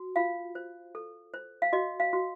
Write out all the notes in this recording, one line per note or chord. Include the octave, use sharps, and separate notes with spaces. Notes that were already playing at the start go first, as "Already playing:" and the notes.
Already playing: F#4
F4 F5
C5
A4
C5
F5
F#4 D#5
F5
F#4